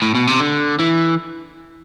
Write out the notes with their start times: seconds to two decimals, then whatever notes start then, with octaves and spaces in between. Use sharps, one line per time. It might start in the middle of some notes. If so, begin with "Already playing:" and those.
0.02 A2
0.15 B2
0.27 C3
0.40 D3
0.80 E3